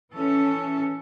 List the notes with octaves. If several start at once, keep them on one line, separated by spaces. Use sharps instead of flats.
E3 C#4 A4